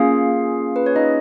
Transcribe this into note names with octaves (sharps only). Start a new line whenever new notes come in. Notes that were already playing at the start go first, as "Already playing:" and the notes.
Already playing: A#3 C#4 F4 G#4 F5
B4
C#5
D#4 D#5